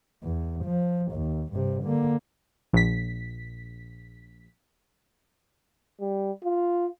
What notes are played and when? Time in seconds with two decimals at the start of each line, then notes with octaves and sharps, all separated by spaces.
0.23 E2
0.65 F3
1.13 D#2
1.53 G2 C3
1.83 D3 A#3
2.73 A#1 B6
6.00 G3
6.44 F4